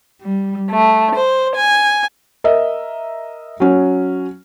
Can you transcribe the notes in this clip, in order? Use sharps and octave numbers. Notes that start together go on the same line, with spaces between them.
G3
A3
C5
G#5
A#4 D#5 E5
F#3 C#4